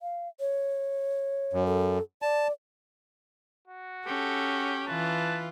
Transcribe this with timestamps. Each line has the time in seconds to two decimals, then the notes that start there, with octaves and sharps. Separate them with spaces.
0.02 F5
0.40 C#5
1.53 F#2
1.66 A4
2.22 D5 A5
3.68 F#4
4.07 C#4 G4 A4
4.88 E3 F4 B4 A5